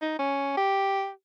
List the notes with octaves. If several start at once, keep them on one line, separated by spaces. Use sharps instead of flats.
D#4
C#4
G4